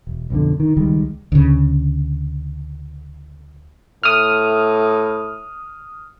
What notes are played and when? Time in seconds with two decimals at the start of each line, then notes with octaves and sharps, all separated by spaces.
0.07 E1
0.30 B1 F2 D3
0.60 D#3
0.76 C#2 D#3 G3 G#3
1.32 D2 C#3
4.03 A2 D#6 F6